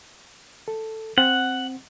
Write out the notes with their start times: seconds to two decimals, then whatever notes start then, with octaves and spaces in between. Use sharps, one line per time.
0.68 A4
1.18 C4 F#5